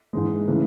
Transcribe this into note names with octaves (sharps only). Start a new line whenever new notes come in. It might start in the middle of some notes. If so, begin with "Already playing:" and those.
G#2 E3 G#3
C#3 E3 A3